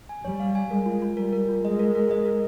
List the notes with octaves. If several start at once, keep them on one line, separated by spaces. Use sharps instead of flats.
G#5
G3 C#5
F5
G#5
G#3 A#4
F4
F4
G3 A#4
A#4
F4
G#3 D#5
A#4
A#4
D#5
A#4